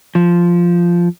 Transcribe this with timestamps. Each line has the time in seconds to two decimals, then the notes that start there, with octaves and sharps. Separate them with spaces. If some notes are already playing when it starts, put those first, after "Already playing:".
0.15 F3